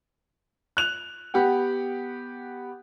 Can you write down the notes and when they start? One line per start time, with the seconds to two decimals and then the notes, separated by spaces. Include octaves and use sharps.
0.77 F#6 F7
1.34 B3 G4 F#5 G5